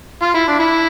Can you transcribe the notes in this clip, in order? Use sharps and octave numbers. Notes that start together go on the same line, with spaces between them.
F4
E4
D4
E4